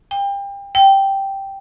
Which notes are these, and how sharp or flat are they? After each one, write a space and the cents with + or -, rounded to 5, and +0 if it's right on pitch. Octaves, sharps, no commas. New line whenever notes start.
G5 +30
G5 -5